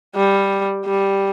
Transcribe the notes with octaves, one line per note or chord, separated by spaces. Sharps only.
G3
G3